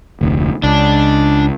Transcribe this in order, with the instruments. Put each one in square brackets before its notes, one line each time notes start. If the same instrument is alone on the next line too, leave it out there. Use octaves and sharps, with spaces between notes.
[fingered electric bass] F1 D2
[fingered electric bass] C#2 [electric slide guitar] D4